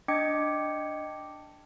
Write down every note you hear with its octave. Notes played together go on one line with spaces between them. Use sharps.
D4 D#5 G5 D6 G#6 C#7